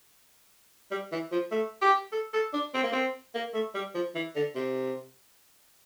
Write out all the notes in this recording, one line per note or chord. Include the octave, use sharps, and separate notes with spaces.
G3
E3
F3
A3
G4
A4
A4
D4
C4
A#3
C4
A#3
A3
G3
F3
E3
D3
C3